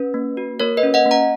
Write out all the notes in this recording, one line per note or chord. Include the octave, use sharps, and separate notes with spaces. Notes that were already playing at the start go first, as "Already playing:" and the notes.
Already playing: C#4 B4
A#3
F#4
A#3 A#4 C#5
B4 D#5
C#4
D#5 F#5
A#3
F#5 A#5